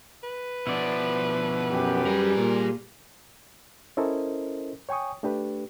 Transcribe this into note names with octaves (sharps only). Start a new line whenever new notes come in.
B4
B2 F3 E4 D5
F#2 G4
G3 G#4 A#4
A#2
C#4 E4 A4 A#4 C5 D#5
C#5 G5 G#5 C#6 D#6
A3 D4 G4 B4